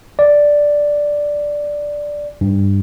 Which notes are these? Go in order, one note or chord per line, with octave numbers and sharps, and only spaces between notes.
D5
G2